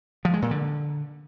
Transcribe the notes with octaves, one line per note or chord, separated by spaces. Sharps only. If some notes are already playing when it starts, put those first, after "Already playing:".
F3
G#3
A#2
D3